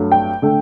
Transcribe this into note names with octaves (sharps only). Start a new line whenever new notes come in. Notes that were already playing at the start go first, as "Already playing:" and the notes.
Already playing: G2 F#3 A3
G5
D3 A3